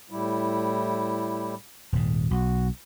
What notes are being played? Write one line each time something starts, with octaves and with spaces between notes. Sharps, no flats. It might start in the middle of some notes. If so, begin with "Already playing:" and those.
A2 G3 E4
D#1 G#2
B1 F#4